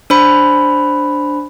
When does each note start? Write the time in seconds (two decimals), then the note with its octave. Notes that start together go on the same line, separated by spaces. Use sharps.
0.10 D4 C5 B5